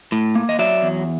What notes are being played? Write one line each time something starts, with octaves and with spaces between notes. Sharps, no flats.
A2
A#3
D#5
F#3 D5 E5
E2